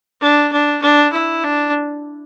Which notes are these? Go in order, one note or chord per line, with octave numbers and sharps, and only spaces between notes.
D4
D4
D4
E4
D4